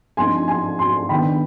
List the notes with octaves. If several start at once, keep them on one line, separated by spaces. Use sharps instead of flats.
G2 F3 C4 D#4 G#5 C6
G#5 C6
G#5 C6
D#3 B3 D4 G5 B5